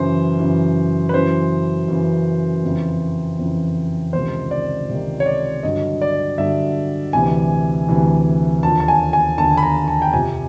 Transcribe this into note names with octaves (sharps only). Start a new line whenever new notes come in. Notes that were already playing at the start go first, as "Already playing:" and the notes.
Already playing: F#2 C#3 E3 C5
F#2 C#3 E3
B4
F#2 C#3 E3 C5
F#2 C#3 E3
F2 C#3 E3
F2 C#3 E3
C#2 C3 D#3 C5
D5
C#2 C3 D#3
C#5
D5
G2 D3 F#3 D#5
D5
G2 D3 F#3 E5
D2 C3 E3 G#5
D2 C3 E3
D#2 D3 F3 A5
A5
G#5
G#5
D#2 D3 F3 A5
B5
A#5
A5
G5
F2 C3 F3 G#5